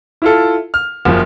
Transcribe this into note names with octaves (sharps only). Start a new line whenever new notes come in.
E4 F4 A4
F6
F#1 F3